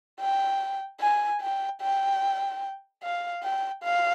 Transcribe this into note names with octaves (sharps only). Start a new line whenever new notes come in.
G5
G#5
G5
G5
F5
G5
F5